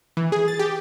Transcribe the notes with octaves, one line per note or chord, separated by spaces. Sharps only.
E3
G#4
A6
G4